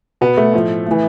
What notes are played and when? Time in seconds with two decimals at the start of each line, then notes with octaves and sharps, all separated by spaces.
0.21 B2 B3
0.37 A3
0.53 A2 F3
0.86 A2 E3